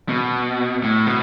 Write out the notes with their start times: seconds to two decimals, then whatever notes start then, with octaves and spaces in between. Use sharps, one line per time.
0.09 B2
0.83 A2
1.07 B2